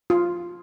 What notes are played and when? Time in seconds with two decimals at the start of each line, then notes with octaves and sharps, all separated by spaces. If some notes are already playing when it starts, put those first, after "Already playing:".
0.10 F4